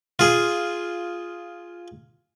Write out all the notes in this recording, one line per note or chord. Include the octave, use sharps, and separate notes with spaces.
F4 G#4